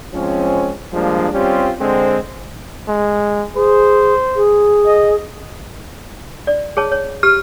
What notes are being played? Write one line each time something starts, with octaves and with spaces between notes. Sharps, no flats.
F3 G#3 C4 C#4
F3 G3 G#3 A#3 D4
G3 C4 C#4 F4 G4
D3 G#3 C4
G#3
G#4 C5
G#4
D#5
D5
G#4 C#5 A5
C#5
G4 F6